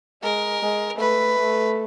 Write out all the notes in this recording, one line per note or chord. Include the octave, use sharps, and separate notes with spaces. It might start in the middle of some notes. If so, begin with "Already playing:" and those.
G#3 A#4
G#3
A3 B4
A3